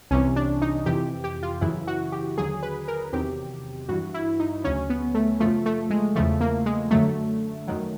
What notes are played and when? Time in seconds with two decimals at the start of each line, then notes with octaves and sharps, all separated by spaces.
0.11 C2 C3 E3 C#4
0.36 D4
0.62 D#4
0.86 F2 C3 E3 G4
1.24 G4
1.43 F4
1.61 F#2 C#3 E3 E4
1.87 F#4
2.12 G4
2.37 D#2 D3 F#3 G#4
2.63 B4
2.88 A#4
3.13 E2 C3 D#3 F#3 G4
3.89 G2 E3 F#4
4.14 E4
4.40 D#4
4.64 D2 C#3 F#3 C#4
4.90 B3
5.14 A3
5.40 F#2 C#3 F3 A3
5.66 A3
5.90 G#3
6.15 E2 C#3 F3 A3
6.41 A#3
6.66 G#3
6.91 F#2 D3 F#3 A3
7.67 F#2 D#3 F#3